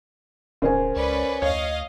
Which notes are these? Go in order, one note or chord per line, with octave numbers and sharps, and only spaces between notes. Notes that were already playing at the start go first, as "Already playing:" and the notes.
D1 C#3 A#4 C5 G#5
C#2 C#4 B4 D5
D2 C#5 D#5 F5